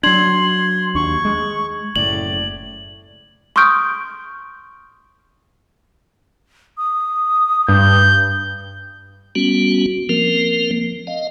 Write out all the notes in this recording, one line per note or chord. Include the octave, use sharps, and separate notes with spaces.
F#3 D4 C6 G#6 F#7
D#2 D4 C#6
G#3
F#1 A2 D5 F#7
C6 C#6 D#6 F6 G6 D7
D#6
G2 G6
G3 B3 C#4 F#4
F3 A#3 C4 A#4
D#5 F5